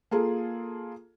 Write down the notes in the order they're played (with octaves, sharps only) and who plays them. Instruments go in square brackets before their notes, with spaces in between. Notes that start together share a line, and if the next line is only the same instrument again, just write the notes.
[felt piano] A#3 F4 G#4 A4